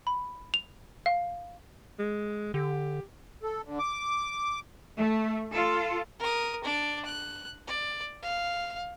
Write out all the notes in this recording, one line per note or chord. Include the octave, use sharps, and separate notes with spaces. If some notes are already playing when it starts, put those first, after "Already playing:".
B5
F7
F5
G#3
D3 G4
A4
D3
D6
A3
F4 A4
A#4 D#6
D4 D5
F#6
D5
F5